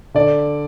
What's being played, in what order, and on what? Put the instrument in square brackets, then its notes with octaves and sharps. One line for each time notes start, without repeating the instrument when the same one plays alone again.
[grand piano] D3 D5